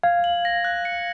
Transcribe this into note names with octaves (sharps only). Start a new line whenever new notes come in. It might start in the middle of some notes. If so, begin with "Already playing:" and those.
F5 G#6
F#7
A#6
F#6
C#7